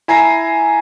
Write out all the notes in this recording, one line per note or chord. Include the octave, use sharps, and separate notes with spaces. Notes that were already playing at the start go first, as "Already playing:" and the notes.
E4 G#5 A#5 C7